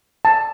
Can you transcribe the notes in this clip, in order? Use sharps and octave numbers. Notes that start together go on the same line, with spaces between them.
A5